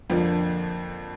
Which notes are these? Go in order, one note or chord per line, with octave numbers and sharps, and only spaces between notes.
F2 D3 F3 A#3